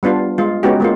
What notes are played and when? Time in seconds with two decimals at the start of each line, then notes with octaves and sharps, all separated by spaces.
0.03 G3 B3 D4 F4
0.38 G#3 F4
0.63 G#3 B3 C#4 D#4 F#4 G4
0.80 G#3 A#3 F4